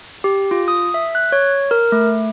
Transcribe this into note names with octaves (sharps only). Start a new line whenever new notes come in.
G4
F4
D#6
E5
F#6
C#5
A#4
A3